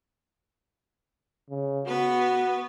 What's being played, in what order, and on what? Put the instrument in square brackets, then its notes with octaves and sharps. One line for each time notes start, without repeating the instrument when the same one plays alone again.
[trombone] C#3
[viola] B3 B4 [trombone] F#4